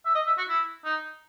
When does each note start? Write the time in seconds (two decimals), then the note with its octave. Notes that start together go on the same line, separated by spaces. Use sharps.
0.05 E5
0.15 D#5
0.27 E5
0.38 F#4
0.49 E4
0.85 D#4